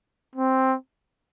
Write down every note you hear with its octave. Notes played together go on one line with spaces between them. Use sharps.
C4